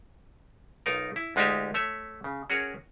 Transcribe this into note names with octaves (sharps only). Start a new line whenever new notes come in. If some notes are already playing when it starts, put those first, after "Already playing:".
B1 D#4 F4 A#4
E4
D2 G#3 D#4 F4 G4 E5
A3 C#5 E5
C#3
C#4 F#4 G#4 A#4 C#5